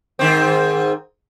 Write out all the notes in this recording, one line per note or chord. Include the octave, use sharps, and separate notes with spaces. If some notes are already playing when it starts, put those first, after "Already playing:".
G#2 D#3 C4